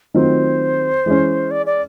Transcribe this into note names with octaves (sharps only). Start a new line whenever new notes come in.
D#3 F#3 A3 C4 F4 C5
E3 G#3 C#4
D5
D5